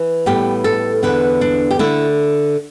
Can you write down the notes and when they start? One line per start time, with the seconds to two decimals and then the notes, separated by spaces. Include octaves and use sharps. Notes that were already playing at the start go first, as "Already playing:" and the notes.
Already playing: E3
0.26 A2 G3 B3 G4
0.64 A4
1.03 E2 D3 B3 B4
1.41 D4
1.71 G4
1.79 D3 A3 E4